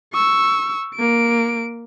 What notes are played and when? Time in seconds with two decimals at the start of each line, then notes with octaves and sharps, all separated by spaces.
0.13 C#6 E6
0.95 A#3 D7